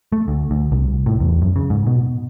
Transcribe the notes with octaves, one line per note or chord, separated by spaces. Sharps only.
A3
D2
D2
C2
A2
E2
F#2
C#3
G#2
B2